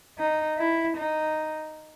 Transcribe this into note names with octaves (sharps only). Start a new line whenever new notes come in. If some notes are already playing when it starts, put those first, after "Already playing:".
D#4
E4
D#4